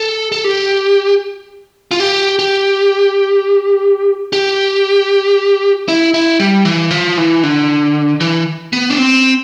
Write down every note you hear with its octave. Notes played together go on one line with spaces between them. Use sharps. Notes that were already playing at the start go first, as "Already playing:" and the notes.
Already playing: A4
A4
G4
F4
G4
G4
G4
E4
E4
G3
E3
F3
E3
D3
E3
B3
D4
C4